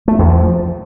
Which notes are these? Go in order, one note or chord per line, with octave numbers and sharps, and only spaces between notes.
A3
E2
F3